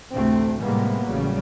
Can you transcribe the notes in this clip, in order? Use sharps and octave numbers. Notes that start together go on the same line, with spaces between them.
A1 D2 C3 A3 C4
A2 C3 G3 G#3 A#3 B3
A1 C#3 F#3 G3